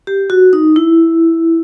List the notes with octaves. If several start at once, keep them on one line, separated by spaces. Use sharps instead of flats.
G4
F#4
D#4
E4